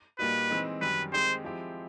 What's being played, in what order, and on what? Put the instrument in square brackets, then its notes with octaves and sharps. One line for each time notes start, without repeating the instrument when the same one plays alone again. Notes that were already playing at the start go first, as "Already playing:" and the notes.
[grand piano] A#2 G3 A#3 D#4 F#4 [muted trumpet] B4
[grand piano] E3 G#3 C4 D#4
[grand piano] F#2 D#3 G3 [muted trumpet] B4
[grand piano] D#3 G#3 C4 D#4 G4 [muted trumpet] C5
[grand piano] F3 G#3 C4 E4 G4